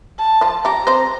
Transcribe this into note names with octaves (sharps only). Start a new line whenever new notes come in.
A5
F3 F4
G3 G4 A#5
C4 C5